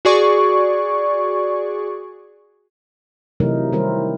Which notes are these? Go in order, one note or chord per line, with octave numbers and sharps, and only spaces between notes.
F#4 G#4 D5 C#6
C3 E3 F#3 A3 D#4 A#4
D#3 G3 C4 E4 A#4